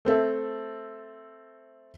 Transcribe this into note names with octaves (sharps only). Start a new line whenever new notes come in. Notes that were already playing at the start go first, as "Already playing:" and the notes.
A3 C4 A4 E5